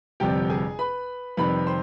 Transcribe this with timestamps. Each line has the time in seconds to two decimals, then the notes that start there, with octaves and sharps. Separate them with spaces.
0.20 G1 F2 C3 G3 G4 G5
0.50 G#4 G#5
0.79 B4 B5
1.37 F2 C3 D#3 G3 B4 B5
1.67 C5 C6